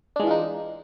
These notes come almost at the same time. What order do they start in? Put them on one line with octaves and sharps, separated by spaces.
D4 G#3 E3 F4 D#4